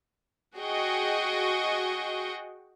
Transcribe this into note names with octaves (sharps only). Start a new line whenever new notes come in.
F#4 G#4 D#5 G5 C#6